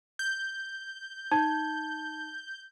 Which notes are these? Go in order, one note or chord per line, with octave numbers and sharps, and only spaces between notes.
G6
D#4 A5 G#6